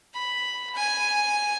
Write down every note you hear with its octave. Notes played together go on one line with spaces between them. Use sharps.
B5
G#5